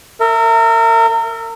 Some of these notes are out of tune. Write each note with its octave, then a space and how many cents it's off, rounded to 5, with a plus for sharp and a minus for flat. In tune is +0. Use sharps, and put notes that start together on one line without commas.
A#4 -35 E5 +0